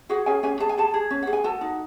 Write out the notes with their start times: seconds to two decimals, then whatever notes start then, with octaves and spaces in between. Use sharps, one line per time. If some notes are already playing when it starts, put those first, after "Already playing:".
0.09 F#4 G#4 F#5
0.26 C#4 G#4 G#5
0.43 C#4 G#4 G#5
0.60 G#4 A5
0.69 G#5
0.77 G#4 A4 A5
0.94 G#4
1.11 C#4
1.23 G#4 F#5
1.33 G#5
1.44 F#4 A4 A5
1.61 D#4